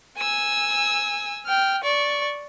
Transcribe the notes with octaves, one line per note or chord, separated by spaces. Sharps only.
G#5 E6
G5 F6
D5 C#6